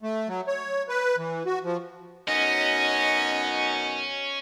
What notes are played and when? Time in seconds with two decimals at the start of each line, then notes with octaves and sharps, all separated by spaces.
0.02 A3
0.28 F#3
0.48 C#5
0.89 B4
1.17 E3
1.46 F#4
1.64 F3
2.28 F#2 B2 C#4 D#4 D#5